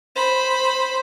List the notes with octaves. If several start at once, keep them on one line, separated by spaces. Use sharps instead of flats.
C5 B5